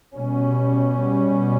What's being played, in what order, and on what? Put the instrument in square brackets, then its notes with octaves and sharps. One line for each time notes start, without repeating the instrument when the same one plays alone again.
[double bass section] B2 G3 C#4